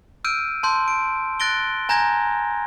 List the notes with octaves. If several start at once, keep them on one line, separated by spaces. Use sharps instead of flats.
E6 F6 G6 D7 D#7
A5 C6 G6
D7
F#6 A6 A#6 D7 G7
G#5 A#5 G6 G#6 A#6